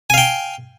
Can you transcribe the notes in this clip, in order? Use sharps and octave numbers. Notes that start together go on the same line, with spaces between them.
F5 G5 G#5